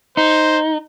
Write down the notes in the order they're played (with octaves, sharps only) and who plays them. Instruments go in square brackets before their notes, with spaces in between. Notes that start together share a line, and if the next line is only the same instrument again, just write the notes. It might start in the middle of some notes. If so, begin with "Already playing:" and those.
[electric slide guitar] D#4 [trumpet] C5